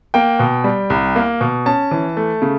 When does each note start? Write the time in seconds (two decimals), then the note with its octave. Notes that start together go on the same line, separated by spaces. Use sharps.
0.14 A#3 G5
0.39 B2
0.64 G3
0.90 C2
1.16 A#3
1.41 B2
1.66 C#4 A5
1.91 E3
2.17 A3
2.42 C#3